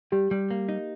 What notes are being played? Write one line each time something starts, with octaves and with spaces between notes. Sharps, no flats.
G3 G4
G3
A#3
D#4